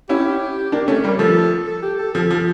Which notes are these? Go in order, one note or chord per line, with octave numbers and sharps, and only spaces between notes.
C#4 E4 G4
A#3 D4
A3 C#4
G3 A#3
F3 A3 A4
A4
G4
A4
F3 A4
F3